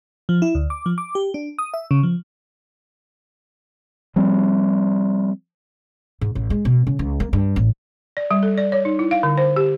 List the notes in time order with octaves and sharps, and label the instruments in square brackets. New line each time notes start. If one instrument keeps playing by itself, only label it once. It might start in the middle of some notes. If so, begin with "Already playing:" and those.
[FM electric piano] F3
E4
D2
D6
F3
D6
G4
D4
D#6
E5
C#3
F3
[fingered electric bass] F3 G3 C4
[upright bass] G#2
A1
G#3
B2
C#3
C#2
A#3
G2
A1
[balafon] D5
G3
A4
D5
C#5
D#4
E4
F5
D3
C5
G4